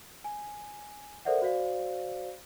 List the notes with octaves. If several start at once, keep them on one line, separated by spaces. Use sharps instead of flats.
G#5
A4 A#4 C5 D5 E5 F#5
F#4 C5 D5 F5